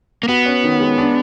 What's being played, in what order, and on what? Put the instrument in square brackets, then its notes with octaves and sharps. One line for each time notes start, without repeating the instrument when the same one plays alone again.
[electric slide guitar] A#3
[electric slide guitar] B3 [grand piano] F#4
[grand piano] C#4
D#3
G#3
D4